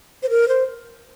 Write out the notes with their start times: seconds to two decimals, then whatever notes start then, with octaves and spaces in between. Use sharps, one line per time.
0.23 C5
0.30 A#4
0.48 C5